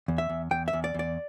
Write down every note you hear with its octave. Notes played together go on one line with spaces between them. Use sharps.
E2
E5
E2
E2 G5
E5
E2
D5
E2 D5